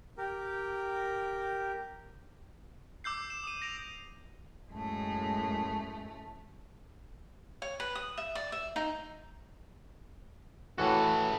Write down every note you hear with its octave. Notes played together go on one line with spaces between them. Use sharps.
G4 A#4
D6 E6 G6 C7
E7
D#6 D#7
A#6 D7 F7
F#2 A2 G#3 A3
C#5
B4
D#6
E5
D5
E5
D#4
A2 E3 F#4 A4 B4